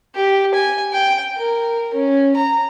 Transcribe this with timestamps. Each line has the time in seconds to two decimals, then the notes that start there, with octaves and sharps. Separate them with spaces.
0.15 G4
0.55 G#5
0.93 G5
1.37 A#4
1.94 C#4
2.36 A#5